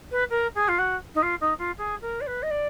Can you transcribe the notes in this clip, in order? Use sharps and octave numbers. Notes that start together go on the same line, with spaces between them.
B4
A#4
G#4
F4
F#4
D#4
F4
D#4
F4
G#4
A#4
D5
B4
D#5
D5